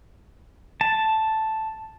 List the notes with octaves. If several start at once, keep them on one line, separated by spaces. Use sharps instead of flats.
A5